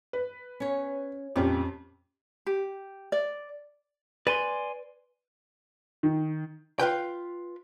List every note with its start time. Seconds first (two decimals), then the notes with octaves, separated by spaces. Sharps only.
0.13 B4
0.60 C#4 C#5
1.36 F2 A#2 C#4 G4
2.46 G4
3.12 D5
4.27 B4 D5 G#5 C6
6.03 D#3
6.79 F4 B4 G5